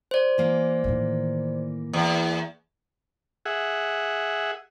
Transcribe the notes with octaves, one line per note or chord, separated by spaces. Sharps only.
C5 D5
E3 A#3
A2 D#3
E2
G#4 E5 F#5